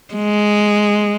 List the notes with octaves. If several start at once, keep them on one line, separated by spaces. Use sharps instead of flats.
G#3